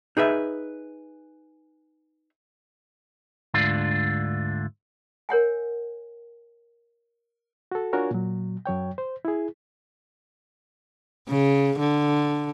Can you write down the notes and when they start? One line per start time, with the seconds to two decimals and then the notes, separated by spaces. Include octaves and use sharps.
0.17 D#4 G#4 B4 E5
3.54 D2 G#2 D3 D4 F4
5.29 A#4 C#5 F#5 G#5
7.72 F#4 A4
7.93 D4 F4 F#4 A#4 C#5 G#5
8.11 A#2 F#3
8.66 F#2 F#3 C#5 G5
8.98 C5
9.25 E4 G#4
11.29 C#3
11.79 D3